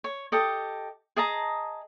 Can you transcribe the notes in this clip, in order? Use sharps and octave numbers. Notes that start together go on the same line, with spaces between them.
C#5
G4 A4 D#5
G#4 D#5 A5 A#5